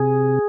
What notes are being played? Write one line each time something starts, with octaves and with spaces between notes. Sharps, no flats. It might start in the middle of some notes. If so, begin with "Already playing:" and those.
Already playing: C3 G#4